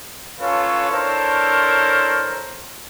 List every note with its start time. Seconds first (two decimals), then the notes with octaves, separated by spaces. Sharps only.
0.39 C#4 F4 A4 B4 C#5 F5
0.91 D4 E4 A4 A#4 C5 C#5